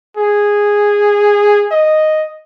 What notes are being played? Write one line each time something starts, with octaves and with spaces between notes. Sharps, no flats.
G#4
D#5